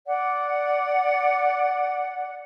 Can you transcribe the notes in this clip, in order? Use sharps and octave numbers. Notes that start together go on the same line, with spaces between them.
D5 F#5